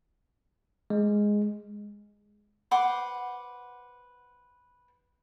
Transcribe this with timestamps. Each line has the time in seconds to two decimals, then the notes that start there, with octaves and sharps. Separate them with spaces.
0.90 G#3
2.71 B4 C5 F#5 D6